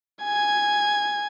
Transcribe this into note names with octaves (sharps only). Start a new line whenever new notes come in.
G#5 G#6